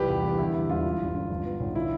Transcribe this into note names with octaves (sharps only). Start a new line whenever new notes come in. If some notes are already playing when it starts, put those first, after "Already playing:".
Already playing: C2 F3 G4 B4
E2
E2
D3 E4
G3 E4
E1 F4
E3
G1
G1
F3
B3
B1
D3 E4